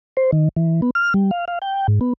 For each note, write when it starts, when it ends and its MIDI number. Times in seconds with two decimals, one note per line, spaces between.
0.17 0.31 72
0.32 0.49 51
0.56 0.81 52
0.82 0.90 59
0.95 1.14 89
1.14 1.31 55
1.31 1.45 77
1.48 1.59 77
1.62 1.87 79
1.88 1.99 44
2.01 2.13 59